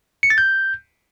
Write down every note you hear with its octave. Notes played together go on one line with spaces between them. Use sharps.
C#7
A6
G6